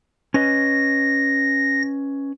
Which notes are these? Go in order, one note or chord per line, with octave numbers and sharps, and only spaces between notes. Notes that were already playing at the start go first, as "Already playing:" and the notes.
C#4 B4 D#5 A#6